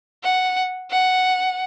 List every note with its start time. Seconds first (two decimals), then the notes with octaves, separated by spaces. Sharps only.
0.23 F#5
0.91 F#5